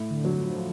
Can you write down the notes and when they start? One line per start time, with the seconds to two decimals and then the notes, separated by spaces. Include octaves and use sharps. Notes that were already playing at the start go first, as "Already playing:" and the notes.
Already playing: A2
0.11 D3
0.25 F#3
0.37 F3